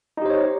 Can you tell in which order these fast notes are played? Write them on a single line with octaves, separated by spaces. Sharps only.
D#4 G4 C5 C#5